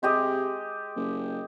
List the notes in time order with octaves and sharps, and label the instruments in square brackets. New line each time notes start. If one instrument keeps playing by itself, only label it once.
[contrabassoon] C3 [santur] G#3 G4 D#5
[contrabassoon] F#1